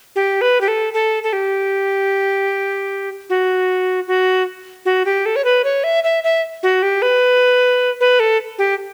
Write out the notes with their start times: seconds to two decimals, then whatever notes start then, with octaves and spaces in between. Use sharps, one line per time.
0.16 G4
0.41 B4
0.61 G4
0.68 A4
0.93 A4
1.23 A4
1.33 G4
3.30 F#4
4.07 F#4
4.86 F#4
5.05 G4
5.26 A4
5.36 C#5
5.44 B4
5.64 C#5
5.84 E5
6.04 E5
6.24 E5
6.63 F#4
6.83 G4
7.02 B4
8.00 B4
8.20 A4
8.58 G4